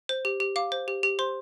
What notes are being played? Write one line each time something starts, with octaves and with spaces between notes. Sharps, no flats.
C5
G4
G4
F5 D6
C5
G4
G4
C5 C6